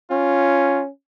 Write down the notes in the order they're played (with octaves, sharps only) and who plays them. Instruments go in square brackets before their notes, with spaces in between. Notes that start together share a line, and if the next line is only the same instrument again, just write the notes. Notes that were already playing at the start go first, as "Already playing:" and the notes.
[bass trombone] C#4 [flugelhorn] F4